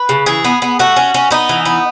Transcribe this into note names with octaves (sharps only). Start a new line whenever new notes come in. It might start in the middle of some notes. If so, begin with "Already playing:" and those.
Already playing: B4
C#3
E3 G#4
B3
B3
A3 F#4
C#4
C#4
B3 D#4
E3
B3